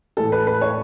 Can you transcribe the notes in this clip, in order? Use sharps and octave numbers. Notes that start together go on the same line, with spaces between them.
A2 E3 A4
B4
B4
C#5